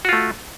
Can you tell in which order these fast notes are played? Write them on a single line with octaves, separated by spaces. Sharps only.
F#4 F4 A3